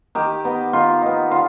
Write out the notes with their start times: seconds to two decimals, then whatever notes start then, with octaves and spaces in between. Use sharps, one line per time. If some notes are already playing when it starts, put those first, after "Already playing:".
0.15 D#3 G4
0.45 B3 D#4
0.73 D#3 F4
1.02 B3 D#4
1.31 D3 F4